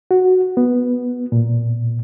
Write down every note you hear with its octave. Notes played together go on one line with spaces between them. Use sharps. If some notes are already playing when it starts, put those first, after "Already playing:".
F#4
B3
A#2